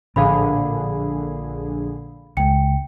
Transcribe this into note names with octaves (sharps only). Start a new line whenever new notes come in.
A#1 A2 D3 D4 G#4 F5 B5
C#2 G#3 G5 C#7